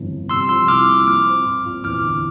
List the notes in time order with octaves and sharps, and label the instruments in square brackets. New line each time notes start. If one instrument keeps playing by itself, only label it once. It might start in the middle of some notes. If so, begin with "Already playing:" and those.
Already playing: [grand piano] G1 F2 E3
G1
[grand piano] C3 [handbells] C6 E6
[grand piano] F3 [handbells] C6 E6
[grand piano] C2 [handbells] D6 F6
[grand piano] A#3
[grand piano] F3 [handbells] D6 F6
[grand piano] C4
A#2
A#2
[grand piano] E2 [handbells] D6 F6
[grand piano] D3